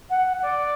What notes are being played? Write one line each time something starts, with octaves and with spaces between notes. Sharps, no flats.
F#5
D5